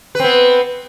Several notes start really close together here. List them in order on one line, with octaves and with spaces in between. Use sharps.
B4 C4 B3